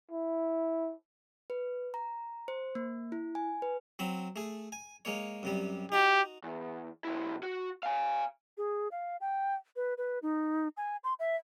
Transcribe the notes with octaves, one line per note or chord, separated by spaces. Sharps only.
E4
B4
A#5
C5
A#3
E4
G#5
B4
F#3 C4 B5
A3 G#4
G#5
G#3 A#3 C#5
F#2 C3 G3
D#4 F#4 G4
E2
B1 E4
F#4
F5 G#5
G#4
F5
G5
B4
B4
D#4
G#5
C6
E5